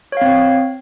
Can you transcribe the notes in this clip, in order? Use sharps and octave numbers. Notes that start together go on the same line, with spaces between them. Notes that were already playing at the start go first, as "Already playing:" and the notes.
C4 C#5 F5